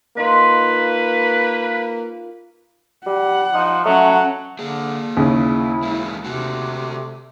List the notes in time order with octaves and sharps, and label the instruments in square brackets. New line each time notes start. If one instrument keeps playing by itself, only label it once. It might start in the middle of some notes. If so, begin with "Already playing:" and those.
[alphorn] A#3 [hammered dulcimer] D#4 F4 [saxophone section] B4
[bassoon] G3 [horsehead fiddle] F#5
[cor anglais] F3 [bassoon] D#4
[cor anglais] F#3 [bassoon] A3 [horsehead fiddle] C#4 F#5
[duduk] D3 [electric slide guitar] A#3 G#4
[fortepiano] D#2 C#3 [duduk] E4
[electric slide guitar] E3 G#3 A#3
[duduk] C3 [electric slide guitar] A3 F#4 A4